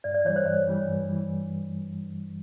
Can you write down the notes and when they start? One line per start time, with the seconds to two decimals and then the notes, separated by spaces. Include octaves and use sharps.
0.04 G2 D5
0.14 D5
0.25 E3 C#5
0.29 G3
0.36 C5
0.46 G2 C#5
0.67 E3 G3
0.88 G2
1.09 E3 G3